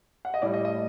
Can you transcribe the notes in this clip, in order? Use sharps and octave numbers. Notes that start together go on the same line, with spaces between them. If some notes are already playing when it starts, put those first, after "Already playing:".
F#5
D#5
A2 G3 D5
D#5
D#5